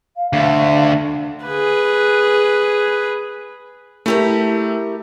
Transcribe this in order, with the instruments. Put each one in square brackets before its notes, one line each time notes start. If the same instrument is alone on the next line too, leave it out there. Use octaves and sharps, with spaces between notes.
[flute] F5
[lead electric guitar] D2 D3 [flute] F5
[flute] A4
[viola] G#4 B4
[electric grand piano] A3 [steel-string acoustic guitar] E4 G4 A#4